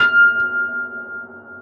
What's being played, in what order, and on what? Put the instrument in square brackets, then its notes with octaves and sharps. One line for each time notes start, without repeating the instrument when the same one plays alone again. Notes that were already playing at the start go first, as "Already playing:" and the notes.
Already playing: [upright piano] F6